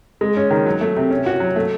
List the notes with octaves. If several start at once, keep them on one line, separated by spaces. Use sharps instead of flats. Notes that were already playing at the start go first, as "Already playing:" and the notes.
G#3
C#4
D#3
F#3
A3
C3
C#4
F#4
F#3
A3